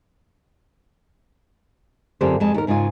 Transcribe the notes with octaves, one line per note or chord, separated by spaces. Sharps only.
F#2 D3 C4 F4 G4 C5
F2 G#3 A5
D#2 A#4
G#2 C#3 D#4 F4 G#5